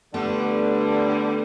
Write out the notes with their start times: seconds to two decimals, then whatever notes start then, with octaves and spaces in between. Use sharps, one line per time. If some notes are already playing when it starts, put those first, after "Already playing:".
0.14 D3 G3 A3 B3 G4